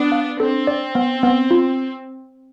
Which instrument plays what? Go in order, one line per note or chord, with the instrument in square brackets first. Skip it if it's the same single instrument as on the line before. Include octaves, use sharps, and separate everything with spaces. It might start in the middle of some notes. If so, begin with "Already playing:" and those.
Already playing: [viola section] B3 D4
[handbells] F5
[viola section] C4 [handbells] A4
[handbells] D5
B3
B3
F4